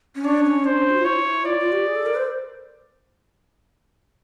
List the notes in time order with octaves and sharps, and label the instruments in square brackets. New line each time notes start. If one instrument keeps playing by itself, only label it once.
[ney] C#4
[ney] D4 [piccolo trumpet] C#5
[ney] C#4
[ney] D4 [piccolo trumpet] C5
[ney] F#4
F4
[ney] E4 [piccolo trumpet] C#5
[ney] F4 [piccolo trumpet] D5
[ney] F4
G4
G#4
A4
A#4
C5